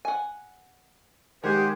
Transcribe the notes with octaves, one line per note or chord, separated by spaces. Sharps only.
F#5 G#5
D#3 G#3 G4 G#4 A#4 C5 F#5